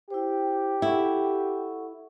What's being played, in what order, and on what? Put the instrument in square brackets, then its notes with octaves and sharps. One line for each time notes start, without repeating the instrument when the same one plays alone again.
[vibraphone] E4 C5 [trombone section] G4
[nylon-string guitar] E4 [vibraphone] A4 F#5 C#6